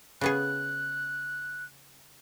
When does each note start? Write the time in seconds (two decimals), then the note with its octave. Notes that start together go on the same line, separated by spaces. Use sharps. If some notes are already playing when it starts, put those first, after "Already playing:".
0.21 C#3 B3 G#4 F#6